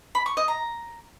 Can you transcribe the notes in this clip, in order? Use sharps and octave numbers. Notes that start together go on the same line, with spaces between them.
B5
C#6
D#5
A#5